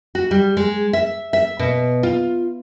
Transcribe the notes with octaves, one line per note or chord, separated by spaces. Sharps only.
F#4
G3
G#3
E5
E5
B2
F4